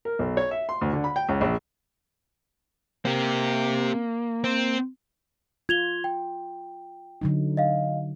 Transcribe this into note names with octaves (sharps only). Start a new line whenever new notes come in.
A#4
B1
C#5
E5
C6
D2
D3
B5
G5
C#2
A#1
A#3 C4 G4
C4
F4 G#6 F7 G7
G5
D3 F#3 D#4
D#5 F5